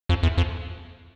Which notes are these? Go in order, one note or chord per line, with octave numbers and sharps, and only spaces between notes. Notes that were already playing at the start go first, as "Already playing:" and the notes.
F2
E2
F2